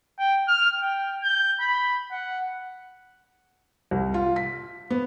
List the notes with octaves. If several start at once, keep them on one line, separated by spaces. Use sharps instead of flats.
G5
F6
G5
G6
B5
F#5
C2
F4
B6
B3